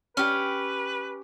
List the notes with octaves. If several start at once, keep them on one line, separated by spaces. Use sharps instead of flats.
C#4 G4 B4 F6